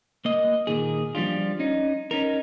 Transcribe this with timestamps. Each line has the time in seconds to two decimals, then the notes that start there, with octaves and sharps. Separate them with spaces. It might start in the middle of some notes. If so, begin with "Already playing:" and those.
0.25 A#3 D#5
0.67 A#2 D#3 G#4
1.15 F3 G3 D4 F4
1.60 C#4 D#4
2.11 C#4 D#4 A#4